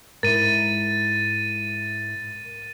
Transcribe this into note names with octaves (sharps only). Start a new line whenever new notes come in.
G#2 E4 A#4 A6 D#7